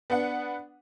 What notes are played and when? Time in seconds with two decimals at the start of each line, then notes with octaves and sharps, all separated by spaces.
0.10 B3 D4 F#5